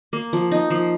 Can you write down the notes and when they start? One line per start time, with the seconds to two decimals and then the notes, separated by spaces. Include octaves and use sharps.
0.13 A#3
0.33 F3
0.52 D#4
0.70 F3